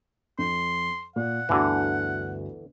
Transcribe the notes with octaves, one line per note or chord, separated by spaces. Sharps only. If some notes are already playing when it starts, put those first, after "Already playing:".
F2 C6
A#2 F#5
G1 D2 D3 E3 F#4